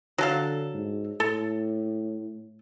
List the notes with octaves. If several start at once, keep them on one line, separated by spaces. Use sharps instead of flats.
D3 F#3 A4 F5
G#2
A2 A4